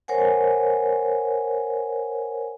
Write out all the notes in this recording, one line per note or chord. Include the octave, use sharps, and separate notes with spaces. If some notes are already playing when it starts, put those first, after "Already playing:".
A#4 C5 C#5 F#5 G#5